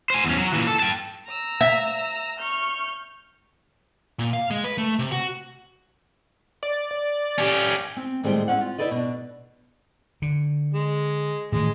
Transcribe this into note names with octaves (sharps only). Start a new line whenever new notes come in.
C5 G#5
E2 C#4
F#3
A#2 E3
A4
G5 A5
A#5 E6
E5
C#6 F6 G6
A#2
F5
G#3
B4
A3
C3
F#4
D5
D5
C#4 G4
C4
A2 D#3 G3 G#3 C5 G5
C4 C#4 F#5
F4
D#4 E4 A4 B4 D5 D#5
B2 D4
D3
G#3
A2 D#3 E3 G#3